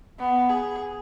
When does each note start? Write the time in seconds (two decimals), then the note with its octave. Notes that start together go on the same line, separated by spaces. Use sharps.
0.19 B3
0.50 G#4